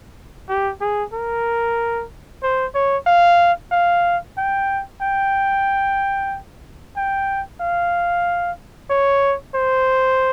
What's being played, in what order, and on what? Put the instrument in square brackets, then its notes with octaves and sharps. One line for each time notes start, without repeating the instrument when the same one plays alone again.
[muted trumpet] G4
G#4
A#4
C5
C#5
F5
F5
G5
G5
G5
F5
C#5
C5